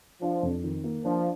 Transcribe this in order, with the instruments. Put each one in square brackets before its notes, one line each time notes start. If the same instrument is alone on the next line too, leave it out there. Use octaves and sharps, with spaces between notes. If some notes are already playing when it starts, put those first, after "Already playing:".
[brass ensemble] F3 [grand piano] D4
[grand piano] F2
D#3
A#3
[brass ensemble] F3 [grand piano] D4